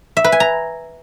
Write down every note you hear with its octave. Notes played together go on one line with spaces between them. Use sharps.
E5
B4
G#5
A#5